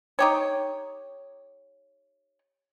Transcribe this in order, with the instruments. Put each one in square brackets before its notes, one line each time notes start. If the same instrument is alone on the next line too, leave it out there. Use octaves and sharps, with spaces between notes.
[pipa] D#4 G4 C#5